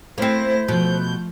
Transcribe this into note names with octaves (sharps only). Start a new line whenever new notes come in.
A3 A#3 C4 E4 C5 A#6
B2 F3 A3 G6